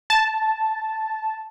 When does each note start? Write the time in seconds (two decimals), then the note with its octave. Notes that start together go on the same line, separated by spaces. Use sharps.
0.10 A5